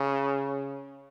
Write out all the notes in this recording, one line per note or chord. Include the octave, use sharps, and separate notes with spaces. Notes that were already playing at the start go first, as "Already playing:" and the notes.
Already playing: C#3